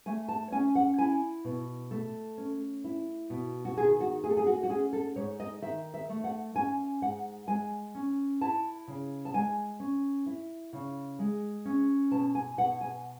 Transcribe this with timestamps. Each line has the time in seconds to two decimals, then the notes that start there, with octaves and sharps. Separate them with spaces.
0.06 A3 G#5
0.29 A5
0.52 C#4 G#5
0.75 F#5
0.98 E4 G#5
1.45 B2
1.91 A3 A4
2.38 C#4
2.84 E4
3.30 B2
3.65 F#4
3.77 D#3 G#4
4.00 F#4
4.24 A3 G#4
4.30 A4
4.37 G#4
4.47 F#4
4.63 F#4
4.70 C#4 G#4
4.93 A4
5.16 G#2 C#5
5.40 D#5
5.62 D#3 E5
5.94 E5
6.09 A3
6.24 F#5
6.55 C#4 G#5
7.01 G#2 F#5
7.47 G#3 G#5
7.95 C#4
8.41 E4 A5
8.88 C#3
9.25 A5
9.34 G#3 G#5
9.80 C#4
10.26 E4
10.73 C#3
11.19 G#3
11.65 C#4
12.11 B2 A5
12.35 G#5
12.58 B2 F#5
12.81 G#5